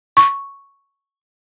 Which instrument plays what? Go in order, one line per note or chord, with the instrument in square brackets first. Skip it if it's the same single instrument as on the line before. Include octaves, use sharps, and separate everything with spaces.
[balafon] C#6